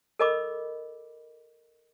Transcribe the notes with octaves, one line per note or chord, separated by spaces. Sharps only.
A4 A#4 D#5 B5 D6